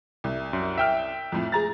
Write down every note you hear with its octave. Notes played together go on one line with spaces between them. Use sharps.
C2
F#2
E5 G5 F6
F2 A2
G#4 A#5 A6